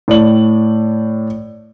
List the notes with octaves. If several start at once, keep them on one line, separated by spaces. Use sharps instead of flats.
A2 D5 F#7